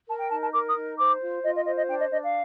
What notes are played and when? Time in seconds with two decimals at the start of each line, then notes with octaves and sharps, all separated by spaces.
0.07 A#4 A5
0.20 G5
0.30 D#4 A5
0.42 A5
0.53 A#4 D6
0.69 D#6
0.76 D#4
0.98 C5 D6
1.21 F4
1.43 F4 D#5
1.55 D#5
1.66 C5 D#5
1.77 D#5
1.88 D4 G5
2.00 D#5
2.11 D4 D#5
2.23 F5